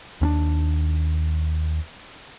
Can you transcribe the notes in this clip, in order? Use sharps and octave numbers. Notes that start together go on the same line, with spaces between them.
D#2 C#4 D4